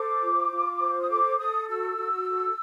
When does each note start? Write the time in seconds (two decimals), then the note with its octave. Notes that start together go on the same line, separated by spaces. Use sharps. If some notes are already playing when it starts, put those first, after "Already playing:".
Already playing: A4 C5 D6
0.21 F4
0.50 F4
0.80 C5
1.00 D#6
1.09 A4 D6
1.38 A4 D#6
1.68 F#4 E6
1.97 F#4
2.27 A4